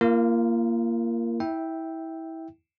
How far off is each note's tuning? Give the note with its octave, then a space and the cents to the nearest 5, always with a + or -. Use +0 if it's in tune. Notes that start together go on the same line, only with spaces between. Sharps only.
A#3 +0 F4 -35 A#4 +0
E4 -25 E5 -5 G5 +0